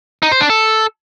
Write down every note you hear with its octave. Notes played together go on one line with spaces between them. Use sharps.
D#4
C5
D4
A4